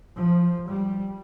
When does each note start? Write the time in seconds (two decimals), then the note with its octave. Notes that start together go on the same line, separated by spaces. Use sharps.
0.17 F3
0.69 G3